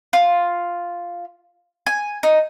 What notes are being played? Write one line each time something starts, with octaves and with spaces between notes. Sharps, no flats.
F4
G#5
D#4